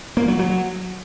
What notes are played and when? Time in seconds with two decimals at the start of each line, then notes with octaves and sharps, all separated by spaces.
0.17 A#3
0.28 F#3
0.39 F#3